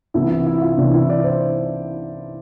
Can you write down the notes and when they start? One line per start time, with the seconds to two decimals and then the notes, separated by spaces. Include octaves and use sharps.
0.14 C2 C3 E3 E4
0.30 E4
0.46 E4
0.62 F4
0.77 C2 C3 E3 D4
0.94 E4
1.09 D5
1.24 C5